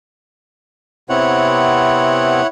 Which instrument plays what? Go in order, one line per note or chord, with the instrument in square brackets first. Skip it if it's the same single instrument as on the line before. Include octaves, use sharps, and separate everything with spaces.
[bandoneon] C3 B3 C4 [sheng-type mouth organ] E4 C#5 F#5